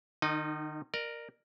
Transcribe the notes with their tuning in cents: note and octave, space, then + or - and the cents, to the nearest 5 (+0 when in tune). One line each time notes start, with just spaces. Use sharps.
D#3 -40 D#4 +0 D#5 -30
A#4 +0 D5 +35